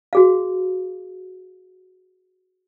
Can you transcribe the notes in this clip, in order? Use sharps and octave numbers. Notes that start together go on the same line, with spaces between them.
F#4 G#4 F5